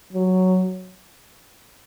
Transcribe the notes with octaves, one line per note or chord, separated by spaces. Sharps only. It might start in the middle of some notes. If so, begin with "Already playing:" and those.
F#3